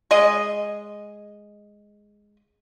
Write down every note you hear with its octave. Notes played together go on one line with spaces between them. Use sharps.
G#3 D#5